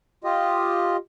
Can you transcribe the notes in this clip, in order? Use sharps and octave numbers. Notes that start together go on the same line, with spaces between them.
F4 G4 D#5